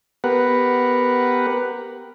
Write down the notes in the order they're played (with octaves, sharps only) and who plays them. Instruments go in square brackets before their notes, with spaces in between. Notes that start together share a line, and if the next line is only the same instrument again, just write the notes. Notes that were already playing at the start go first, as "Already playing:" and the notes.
[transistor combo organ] B3 G4 A#4 B4 F#5